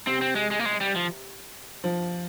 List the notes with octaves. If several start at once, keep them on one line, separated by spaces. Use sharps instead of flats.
C3 C4
C4
G#3
G#3
A#3
G#3
G3
F3
F3